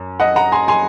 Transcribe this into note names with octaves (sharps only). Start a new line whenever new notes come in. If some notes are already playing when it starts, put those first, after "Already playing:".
Already playing: F#2
D#5 F#5
F#5 A#5
G#5 C6
G#5 C6